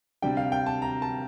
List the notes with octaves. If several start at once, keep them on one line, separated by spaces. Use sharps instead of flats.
C3 G3 D4 G5
F5
G5
A5
A#5
A5